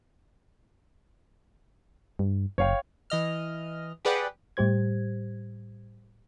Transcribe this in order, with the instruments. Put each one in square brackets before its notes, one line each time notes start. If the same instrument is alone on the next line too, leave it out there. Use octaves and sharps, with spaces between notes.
[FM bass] G2
[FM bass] F#1 [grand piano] C#5 F5 G5
[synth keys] E3 D#5 F6
G4 G#4 B4 D5 F#5 G5
[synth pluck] A2 G3 G4 C5 G#6